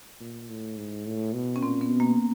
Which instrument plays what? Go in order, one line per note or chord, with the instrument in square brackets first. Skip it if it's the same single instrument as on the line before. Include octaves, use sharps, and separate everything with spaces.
[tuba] A#2
A2
G#2
A2
B2
[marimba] C#4
[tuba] A#2 [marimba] C4
[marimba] B3
[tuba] B2
[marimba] A#3